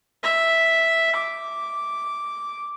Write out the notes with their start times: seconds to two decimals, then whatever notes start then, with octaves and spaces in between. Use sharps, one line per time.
0.23 E5
1.16 D6